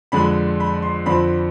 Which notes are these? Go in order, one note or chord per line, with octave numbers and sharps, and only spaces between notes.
F2 D3 G#3 B5
B5
C6
F2 D3 F3 C4 B5